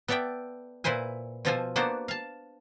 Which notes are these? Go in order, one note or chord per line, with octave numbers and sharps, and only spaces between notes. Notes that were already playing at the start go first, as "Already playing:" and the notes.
B3 A4 D5 E5 G5
A#2 E4 B4 C5 G#5
B2 F3 F4 A4 C5 G#5
A#3 B3 D4 F#4 C5
F5 A5